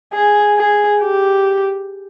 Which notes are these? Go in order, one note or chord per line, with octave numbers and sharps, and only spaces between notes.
G#4
G#4
G4